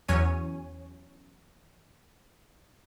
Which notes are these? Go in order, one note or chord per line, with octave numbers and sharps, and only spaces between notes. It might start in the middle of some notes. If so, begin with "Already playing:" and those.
E2 F#3 C#4 C#5 G#5 D#7